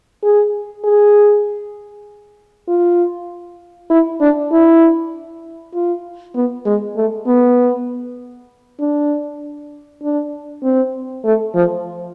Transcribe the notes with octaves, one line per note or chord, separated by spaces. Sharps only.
G#4
G#4
F4
E4
D4
E4
F4
B3
G#3
A3
B3
D4
D4
C4
A3
F3